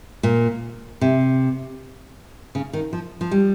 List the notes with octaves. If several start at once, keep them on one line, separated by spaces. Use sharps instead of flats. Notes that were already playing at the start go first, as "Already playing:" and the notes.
A#2
C3
C#3
D#3
F3
F3
G3